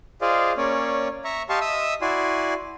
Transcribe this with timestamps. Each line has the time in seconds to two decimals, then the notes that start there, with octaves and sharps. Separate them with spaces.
0.21 F4 G#4 C5 D5 D#5 F5
0.57 A#3 C#4 C#5 D5
1.24 E5 A#5 C#6
1.49 G4 D#5 F5 A5 C6 C#6
1.61 D#5 E5 D#6 E6
2.02 E4 F#4 D5 G#5 C6